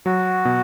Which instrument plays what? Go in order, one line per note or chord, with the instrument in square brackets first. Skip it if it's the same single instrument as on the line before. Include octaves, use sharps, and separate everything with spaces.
[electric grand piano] F#3 [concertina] F#4
[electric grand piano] B2